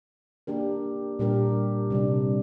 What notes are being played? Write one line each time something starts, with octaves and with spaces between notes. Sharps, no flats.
A#3 D4 G4 A#4
A#2 G3 D4 G4 A#4
C3 G3 D4